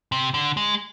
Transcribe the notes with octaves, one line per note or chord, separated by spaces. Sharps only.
C3
D3
G#3